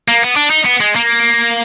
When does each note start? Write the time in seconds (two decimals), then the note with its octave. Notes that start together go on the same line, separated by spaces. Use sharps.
0.08 A#3
0.22 B3
0.36 D4
0.50 D#4
0.65 B3
0.80 G#3
0.95 A#3